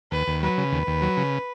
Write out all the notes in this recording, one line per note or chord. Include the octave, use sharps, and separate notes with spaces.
D#2 B4
D#2
F#3 B4
C#3
D#2
D#2
F#3
C#3